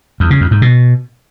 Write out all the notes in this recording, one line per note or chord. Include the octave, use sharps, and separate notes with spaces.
E2
C#3
F2
G#2
B2